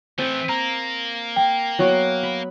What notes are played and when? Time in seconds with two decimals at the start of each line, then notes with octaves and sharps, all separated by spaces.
0.18 E3 A3 C4
0.49 A#3 A#5
1.36 G5
1.79 F#3 B3 F#4
2.23 B5